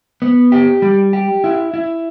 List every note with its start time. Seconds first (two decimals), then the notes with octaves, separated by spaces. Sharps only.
0.22 B3
0.52 G4
0.82 G3
1.13 G4
1.44 E4
1.74 E4